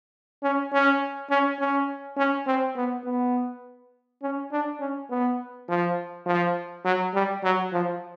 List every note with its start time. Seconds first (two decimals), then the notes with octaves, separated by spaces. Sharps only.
0.43 C#4
0.72 C#4
1.30 C#4
1.59 C#4
2.17 C#4
2.47 C4
2.76 B3
3.05 B3
4.22 C#4
4.52 D4
4.80 C#4
5.10 B3
5.69 F3
6.26 F3
6.85 F#3
7.14 G3
7.43 F#3
7.73 F3